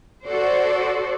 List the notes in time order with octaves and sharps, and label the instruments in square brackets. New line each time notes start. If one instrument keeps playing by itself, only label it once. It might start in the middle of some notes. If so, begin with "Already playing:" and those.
[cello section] F#4 A4 C5 D5